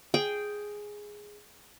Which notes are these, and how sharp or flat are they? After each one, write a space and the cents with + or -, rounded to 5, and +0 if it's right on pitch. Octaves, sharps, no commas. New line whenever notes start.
G#4 +0 G5 +0